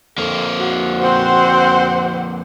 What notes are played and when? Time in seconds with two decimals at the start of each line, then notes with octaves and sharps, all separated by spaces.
0.18 F2 A#3 A4
0.59 F#4
1.01 C4 C5 F#5